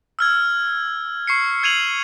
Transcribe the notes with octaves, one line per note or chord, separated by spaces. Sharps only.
E6 F6 G#6
C#6 C7 C#7
F6 G#6 C#7 D#7 F7 F#7